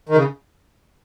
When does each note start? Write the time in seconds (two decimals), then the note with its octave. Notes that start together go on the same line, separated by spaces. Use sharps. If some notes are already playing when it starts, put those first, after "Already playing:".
0.09 D#3
0.16 C#3